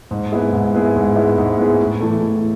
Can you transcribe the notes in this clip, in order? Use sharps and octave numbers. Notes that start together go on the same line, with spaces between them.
G#2
G#3 B3 E4 G#4
G#2
G#3 B3 E4 G#4
G#2
G#3 B3 E4 G#4
G#2
G#3 B3 E4 G#4
A2
E3 A3 E4 A4
A2